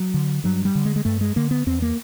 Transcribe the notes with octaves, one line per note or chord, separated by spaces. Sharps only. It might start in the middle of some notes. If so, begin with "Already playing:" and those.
Already playing: F#3
D3
G2 F#3
G3
D3
G#3
G#3
G2 A3
G#3
D3 A#3
B3
E2 C4
A#3